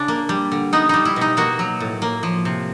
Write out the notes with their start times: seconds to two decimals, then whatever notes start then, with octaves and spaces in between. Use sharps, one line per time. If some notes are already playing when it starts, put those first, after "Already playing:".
Already playing: C#3 D4
0.08 A#3
0.29 G3
0.52 D3
0.73 B3 D#4
0.89 G3 D#4
1.05 E4
1.16 B2
1.21 D#4
1.37 A#3 F#4
1.59 F#3
1.80 A2
2.02 A#3
2.23 F3
2.45 C3